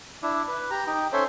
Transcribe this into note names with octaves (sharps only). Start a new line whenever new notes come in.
D4 E4
B4
G4 A#5
D#4 G5
C#4 A4 C5 C#5 E5